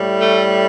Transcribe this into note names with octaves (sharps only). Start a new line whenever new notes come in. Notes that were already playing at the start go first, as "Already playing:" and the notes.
Already playing: A2 G3
A3